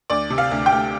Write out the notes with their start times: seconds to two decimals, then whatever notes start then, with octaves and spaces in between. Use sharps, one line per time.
0.10 D2 D5
0.30 C3
0.38 F5
0.51 D2
0.66 G5
0.72 D2